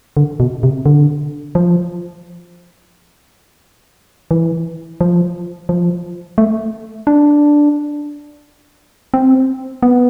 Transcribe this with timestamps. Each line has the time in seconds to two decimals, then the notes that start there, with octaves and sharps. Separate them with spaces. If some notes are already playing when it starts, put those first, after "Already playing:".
0.17 D3
0.40 B2
0.63 C3
0.86 D3
1.55 F3
4.31 E3
5.01 F3
5.69 F3
6.38 A3
7.07 D4
9.14 C4
9.83 B3